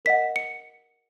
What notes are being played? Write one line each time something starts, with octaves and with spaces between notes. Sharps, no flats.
A#4 D#5 F#5 B6
C#7